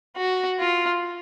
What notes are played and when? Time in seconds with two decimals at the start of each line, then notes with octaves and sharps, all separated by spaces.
0.17 F#4
0.59 F4